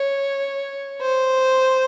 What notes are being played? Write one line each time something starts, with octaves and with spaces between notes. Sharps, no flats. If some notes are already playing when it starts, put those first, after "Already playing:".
Already playing: C#5
C5